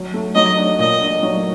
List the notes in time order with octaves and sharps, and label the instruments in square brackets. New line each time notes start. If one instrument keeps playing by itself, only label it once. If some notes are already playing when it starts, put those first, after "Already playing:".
Already playing: [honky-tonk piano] F#3
A3
[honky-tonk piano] F#3 [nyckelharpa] D#5
[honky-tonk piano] D4
[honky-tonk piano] A#2 [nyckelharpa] D#5
[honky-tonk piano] D4
F#3